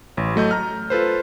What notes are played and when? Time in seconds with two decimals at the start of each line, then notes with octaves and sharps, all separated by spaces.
0.17 A1
0.36 F#3 A3 D#5 G6
0.51 A#5 F6
0.90 F4 A4 B4 C5